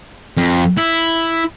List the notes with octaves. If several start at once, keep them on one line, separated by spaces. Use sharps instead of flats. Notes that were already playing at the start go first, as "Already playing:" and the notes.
F2
E4